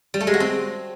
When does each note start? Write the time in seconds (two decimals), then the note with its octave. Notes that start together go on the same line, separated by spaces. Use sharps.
0.14 G3
0.20 A3
0.27 G#3
0.34 F#4
0.40 C4